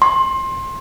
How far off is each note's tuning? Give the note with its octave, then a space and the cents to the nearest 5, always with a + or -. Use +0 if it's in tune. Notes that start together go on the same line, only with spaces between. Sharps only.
C6 +25